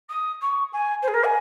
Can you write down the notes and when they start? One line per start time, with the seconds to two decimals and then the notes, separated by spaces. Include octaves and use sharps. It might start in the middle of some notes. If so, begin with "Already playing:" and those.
0.09 D#6
0.41 C#6
0.72 G#5
1.02 C5
1.07 G#4
1.13 A#4
1.24 G#5